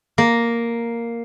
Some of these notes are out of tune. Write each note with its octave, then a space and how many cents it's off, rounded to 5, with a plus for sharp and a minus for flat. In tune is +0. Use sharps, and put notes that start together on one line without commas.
A#3 +0